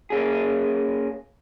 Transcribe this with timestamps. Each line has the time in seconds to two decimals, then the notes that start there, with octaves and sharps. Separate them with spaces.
0.10 A#3 C#4 G#4